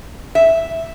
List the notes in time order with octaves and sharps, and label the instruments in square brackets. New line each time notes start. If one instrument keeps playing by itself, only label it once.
[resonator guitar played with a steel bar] E5